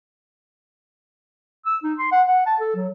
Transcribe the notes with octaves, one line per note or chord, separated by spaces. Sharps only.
E6
D#4
C6
F#5
F#5
A5
A4
F#3